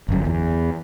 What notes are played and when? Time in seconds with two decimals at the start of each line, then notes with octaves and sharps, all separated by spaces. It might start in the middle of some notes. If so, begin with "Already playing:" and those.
0.09 G1 F#2
0.25 E2